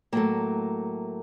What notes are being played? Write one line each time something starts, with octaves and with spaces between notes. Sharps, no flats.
A2 F#3 A3 A#3